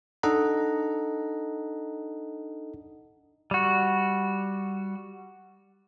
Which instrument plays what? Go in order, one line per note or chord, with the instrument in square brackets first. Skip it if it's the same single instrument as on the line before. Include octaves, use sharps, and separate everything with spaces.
[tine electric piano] D4 D#4 A4 D#5 F#5 A#5
[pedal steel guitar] G3 F#4